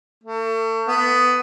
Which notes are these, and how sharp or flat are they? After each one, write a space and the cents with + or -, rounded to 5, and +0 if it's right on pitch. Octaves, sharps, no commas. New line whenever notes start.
A3 +35
B3 +15